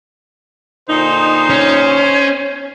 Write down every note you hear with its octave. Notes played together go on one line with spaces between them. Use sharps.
A#2 D3 D#4 C5
C#4